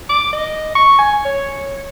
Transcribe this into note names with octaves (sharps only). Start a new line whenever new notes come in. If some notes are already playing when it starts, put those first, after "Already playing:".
D6
D#5
C#6
G#5
C#5